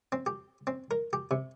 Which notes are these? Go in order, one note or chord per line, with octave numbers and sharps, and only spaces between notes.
C4
G4
C4
A#4
G4
C3